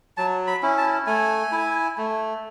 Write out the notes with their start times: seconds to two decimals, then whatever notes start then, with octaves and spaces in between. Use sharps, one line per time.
0.17 F#3 A5
0.47 B5
0.62 C#4 E4
0.78 A5
1.07 A3 G#5
1.52 E4
1.98 A3